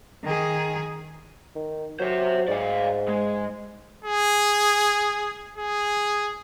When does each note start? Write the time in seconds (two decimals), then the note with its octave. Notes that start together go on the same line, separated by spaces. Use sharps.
0.24 D#3 G#4
1.56 D#3
2.00 F#3 C5 E5
2.48 G#2 D5 F5
3.09 G#3
4.05 G#4
5.58 G#4